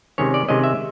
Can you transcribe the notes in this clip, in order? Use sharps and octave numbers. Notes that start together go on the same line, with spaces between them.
C3 D#3 G#3 C#4 C#5
D5
C3 D#3 G#3 C#4 D#5
E5